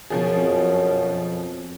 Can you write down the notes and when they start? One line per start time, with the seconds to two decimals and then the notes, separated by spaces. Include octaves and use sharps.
0.10 F#2 B2 F3 G#4
0.37 F2